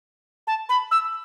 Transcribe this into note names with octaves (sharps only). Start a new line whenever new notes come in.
A5
B5
E6